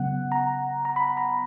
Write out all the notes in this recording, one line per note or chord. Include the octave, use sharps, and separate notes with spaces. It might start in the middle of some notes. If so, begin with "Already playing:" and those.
Already playing: C#3 F#3 B3 F#5
A#5
A#5
B5
A#5